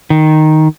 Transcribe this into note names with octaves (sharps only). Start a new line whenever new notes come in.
D#3